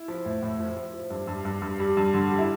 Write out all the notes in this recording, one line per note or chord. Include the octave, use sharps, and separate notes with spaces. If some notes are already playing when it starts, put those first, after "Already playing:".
Already playing: E4
F3
A2
A2
F3
F3
F3
G2
G2
G2
G2
G3
G2
D3
G3
E4